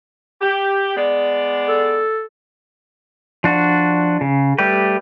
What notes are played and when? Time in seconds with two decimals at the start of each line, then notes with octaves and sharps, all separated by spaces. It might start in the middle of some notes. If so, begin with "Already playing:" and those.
0.41 G4
0.97 G#3 B3 D5
1.68 A4
3.44 F3 D4 F#4
4.21 C#3
4.58 G3 A3 G4 B4